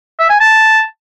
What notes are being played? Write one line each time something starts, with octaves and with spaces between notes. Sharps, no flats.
E5
G#5
A5